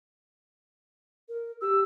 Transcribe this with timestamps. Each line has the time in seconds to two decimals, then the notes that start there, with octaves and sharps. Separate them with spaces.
1.29 A#4
1.62 G4 E6